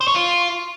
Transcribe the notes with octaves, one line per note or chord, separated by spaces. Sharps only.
C5
C#5
F4